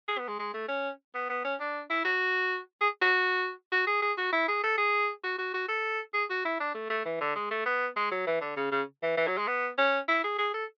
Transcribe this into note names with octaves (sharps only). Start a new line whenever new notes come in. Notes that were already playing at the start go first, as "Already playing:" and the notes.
G#4
B3
G#3
G#3
A3
C#4
B3
B3
C#4
D4
E4
F#4
G#4
F#4
F#4
G#4
G#4
F#4
E4
G#4
A4
G#4
F#4
F#4
F#4
A4
G#4
F#4
E4
D4
A3
A3
E3
D3
G#3
A3
B3
G#3
F#3
E3
D3
C#3
C#3
E3
E3
F#3
G#3
B3
C#4
E4
G#4
G#4
A4